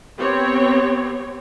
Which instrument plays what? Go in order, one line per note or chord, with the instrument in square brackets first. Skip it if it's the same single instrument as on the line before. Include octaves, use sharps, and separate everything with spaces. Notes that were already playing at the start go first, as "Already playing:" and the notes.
[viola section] B3 C4 G4 C#5